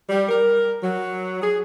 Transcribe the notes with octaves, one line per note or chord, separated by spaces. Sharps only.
G3
A#4
F#3
G#4